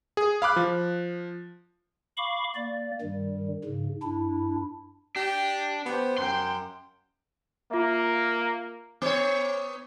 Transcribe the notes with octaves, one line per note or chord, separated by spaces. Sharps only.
G#4
F5 B5 D6 F#6
F3
F5 B5 C#6 D6
A#3 D5
G2 D#3 G3
G#2 C#3
G2 D4 E4
D4 G4
B3 G4 C5
F#2 G5 C6
A#3 F4 E5
B3 C#5